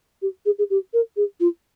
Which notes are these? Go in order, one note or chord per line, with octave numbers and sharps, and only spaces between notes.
G4
G#4
G#4
G4
A#4
G#4
F4